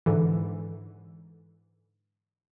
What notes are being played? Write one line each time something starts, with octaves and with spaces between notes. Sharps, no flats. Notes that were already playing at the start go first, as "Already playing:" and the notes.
G#2 D3 E3